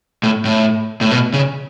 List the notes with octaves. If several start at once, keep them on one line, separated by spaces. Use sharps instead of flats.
A2
A2
A2
B2
C#3